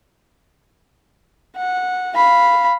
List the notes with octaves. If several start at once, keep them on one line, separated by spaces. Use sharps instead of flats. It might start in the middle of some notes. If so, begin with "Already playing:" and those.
F#5
F5 B5